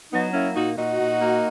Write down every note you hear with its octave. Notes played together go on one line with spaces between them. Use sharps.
F#3 B3 D#4
A#3 C#4 E4
A#2 D#4 F#4
A#2 D#4 F#4
A#2
A#3